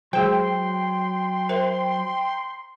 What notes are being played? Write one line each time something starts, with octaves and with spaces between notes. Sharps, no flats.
F#3 G#3 G#4 C5 G5 C6
A#4 C5 E5